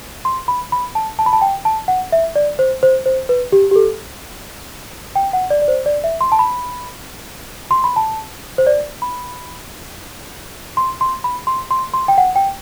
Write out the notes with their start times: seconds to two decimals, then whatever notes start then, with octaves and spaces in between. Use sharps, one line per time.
0.25 C6
0.48 B5
0.72 B5
0.95 A5
1.19 A5
1.26 B5
1.33 A5
1.41 G5
1.65 A5
1.88 F#5
2.12 E5
2.36 D5
2.59 C5
2.83 C5
3.06 C5
3.29 B4
3.52 G4
3.71 G4
3.76 A4
5.16 G5
5.33 F#5
5.50 D5
5.62 D5
5.68 C5
5.86 D5
6.04 E5
6.21 C6
6.32 A5
6.39 B5
7.71 C6
7.84 B5
7.96 A5
8.58 C5
8.67 D5
9.02 B5
10.77 C6
11.01 C6
11.24 B5
11.47 C6
11.71 C6
11.94 C6
12.08 G5
12.18 F#5
12.36 G5